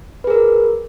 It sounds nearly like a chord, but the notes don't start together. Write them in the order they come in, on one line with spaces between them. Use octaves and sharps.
B4 G#4 A#4